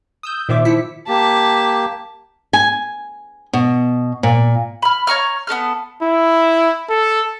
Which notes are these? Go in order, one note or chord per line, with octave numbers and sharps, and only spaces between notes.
D#6 E6 G6
A#2 D#3 C5 E5 D6
F3 E4 E6 B6 C#7
A#3 G4 A5 B6
G#5
B2
A#2
B5 F6
C#5 A#5 C#6 F6
B3 C#4 A4 F6
E4
A4